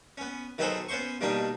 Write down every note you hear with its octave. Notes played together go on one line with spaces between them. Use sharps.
B3 C#4
D#3 F#3 B3 G#4 A4 C5
B3 C#4 C5 C6 C#6
B2 D#3 G3 A#3 D4 D#4